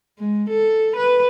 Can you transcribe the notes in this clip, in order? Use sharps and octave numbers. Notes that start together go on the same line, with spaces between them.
G#3
A4
B4